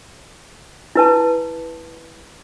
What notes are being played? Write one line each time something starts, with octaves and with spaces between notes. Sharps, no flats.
E4 B4 A5